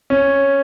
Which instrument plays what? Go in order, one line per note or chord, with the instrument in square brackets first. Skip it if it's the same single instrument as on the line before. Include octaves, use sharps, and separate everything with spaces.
[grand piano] C#4